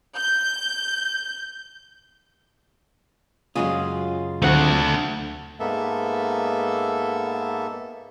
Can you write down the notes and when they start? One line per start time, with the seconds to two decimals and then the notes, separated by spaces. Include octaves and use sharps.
0.17 G6
3.55 F#2 C#3 G#3 C#4 F4 D#6
4.42 D2 D3 F#3 A3 C4 F#5
5.60 G#2 A#3 B3 A4 E5